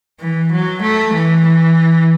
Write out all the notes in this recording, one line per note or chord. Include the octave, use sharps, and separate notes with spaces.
E3
F#3
A3
E3